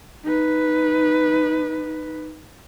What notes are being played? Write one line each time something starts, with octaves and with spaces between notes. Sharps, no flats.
D#4 B4